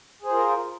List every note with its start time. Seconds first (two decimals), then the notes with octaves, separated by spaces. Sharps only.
0.22 G#4
0.26 C5
0.30 F4
0.34 A#4